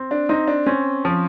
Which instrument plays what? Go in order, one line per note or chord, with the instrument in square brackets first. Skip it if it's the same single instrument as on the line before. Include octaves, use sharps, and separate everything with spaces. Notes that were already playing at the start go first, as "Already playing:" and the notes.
Already playing: [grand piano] C4
[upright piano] D4
[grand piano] C4 [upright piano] D#4
[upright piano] D4
[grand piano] C4 [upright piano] C#4
[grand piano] F3